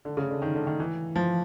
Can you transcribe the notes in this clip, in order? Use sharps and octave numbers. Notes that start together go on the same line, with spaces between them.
D3
C#3
D3
D#3
D3
D#3
E3
F3